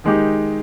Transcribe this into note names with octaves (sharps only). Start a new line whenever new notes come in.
D#3 G#3 D#4 G4